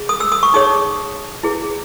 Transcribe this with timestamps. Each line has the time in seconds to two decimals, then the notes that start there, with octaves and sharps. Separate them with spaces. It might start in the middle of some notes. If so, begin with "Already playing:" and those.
Already playing: G#4
0.09 D#6
0.20 E6
0.32 D#6
0.43 C#6
0.54 D#4 G#4 C#5 D#6
1.43 E4 G#4 B4